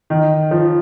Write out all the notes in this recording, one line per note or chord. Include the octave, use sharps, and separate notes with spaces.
D#3
F3